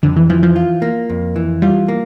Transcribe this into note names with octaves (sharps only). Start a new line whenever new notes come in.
F2 D3
E3
E3 F3
F3
F4
A#3
F2
E3
G3 F4
A#3